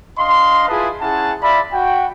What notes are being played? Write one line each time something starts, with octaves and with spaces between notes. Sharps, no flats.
D4 D#5 F5 C6
E4 F4 G#4 B4 A5 D#6
C#4 E4 G#4 F#5 A5
F4 D5 E5 B5
F#4 F#5 G5